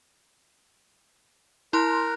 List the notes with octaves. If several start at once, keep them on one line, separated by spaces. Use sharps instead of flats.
E4 A#4 C6 F#6